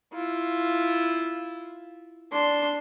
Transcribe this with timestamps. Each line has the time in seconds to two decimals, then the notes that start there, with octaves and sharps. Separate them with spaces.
0.13 E4 F4
2.32 D4 C6